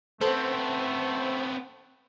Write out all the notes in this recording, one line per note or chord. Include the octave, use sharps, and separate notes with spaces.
A3 B3 C4 A4 C5